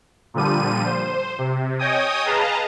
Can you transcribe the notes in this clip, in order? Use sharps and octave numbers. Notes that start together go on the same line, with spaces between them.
A#2 D3 F3 G3 D#7
C5
C3
C#5 D#5 G5 G#5 D#6
G#4 B4 D#5 F5 A5 A#5